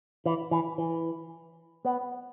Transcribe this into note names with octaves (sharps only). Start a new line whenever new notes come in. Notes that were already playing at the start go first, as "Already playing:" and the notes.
E3
E3
E3
B3